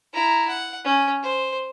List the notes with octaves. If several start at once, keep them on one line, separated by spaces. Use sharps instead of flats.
E4 A#5
F#5
C#4
C5